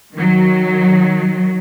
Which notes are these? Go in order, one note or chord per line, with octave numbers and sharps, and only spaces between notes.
D#3 F#3